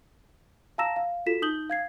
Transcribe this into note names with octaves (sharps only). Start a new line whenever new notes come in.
F5 A5 A#5 E6 A#6 E7
F5
F4 F#4 A4 B6 E7
D#4 D#6 G6 F#7 G7
F5 G#6 C7